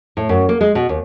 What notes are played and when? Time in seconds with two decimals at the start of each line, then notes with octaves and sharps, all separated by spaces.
0.17 A2
0.29 F#2
0.49 A#3
0.61 G#3
0.75 B2
0.89 D#2